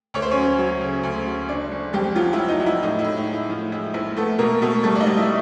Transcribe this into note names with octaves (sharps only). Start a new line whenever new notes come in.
D2 C#5
C5
C#4 C#5
F#3
F#3
C#3
D2
F#3
F#1 D4 D5
F#1
F2 G3 G4
F3 F#3 F4
E4
F#3
D#4
F#3
E4
A2 D#4
E4
A2
D#4
G#3
E4
A2 F3 F4
G#3 E4
A#1 E4
A3 B3 A4
B2 A#3 A#4
B2 A3 A4
G3 A3 A4
D5
D#4 D#5
G3
E4 E5